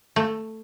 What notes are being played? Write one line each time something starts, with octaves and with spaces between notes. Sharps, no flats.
A3